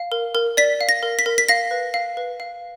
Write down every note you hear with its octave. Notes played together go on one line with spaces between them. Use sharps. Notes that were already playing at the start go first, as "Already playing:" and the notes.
Already playing: F5
A#4
A#4
D5 B6
F5
A#6
A#4
B6
A#4
B6
F5 A#6
B4
F5
B4
F5